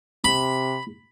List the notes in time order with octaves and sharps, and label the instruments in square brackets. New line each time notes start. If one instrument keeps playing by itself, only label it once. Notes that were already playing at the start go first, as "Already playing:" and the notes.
[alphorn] C3 [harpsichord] B5